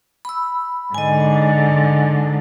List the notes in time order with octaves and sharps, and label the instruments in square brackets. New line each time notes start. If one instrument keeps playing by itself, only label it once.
[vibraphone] B5 E6
[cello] G#2 D3 [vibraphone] D#5 G#5